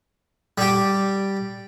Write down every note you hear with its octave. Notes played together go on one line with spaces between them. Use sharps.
G3 G4